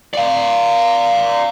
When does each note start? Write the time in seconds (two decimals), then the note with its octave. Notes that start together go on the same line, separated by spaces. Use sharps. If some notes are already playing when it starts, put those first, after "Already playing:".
0.14 D5 F5